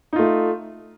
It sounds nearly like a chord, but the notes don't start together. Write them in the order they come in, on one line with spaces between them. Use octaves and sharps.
D#4 F4 A3